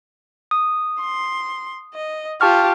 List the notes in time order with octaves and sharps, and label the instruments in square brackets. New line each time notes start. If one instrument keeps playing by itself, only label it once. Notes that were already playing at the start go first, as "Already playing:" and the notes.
[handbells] D#6
[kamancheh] C6
D#5
[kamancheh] F4 G4 [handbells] A5 C#6 F6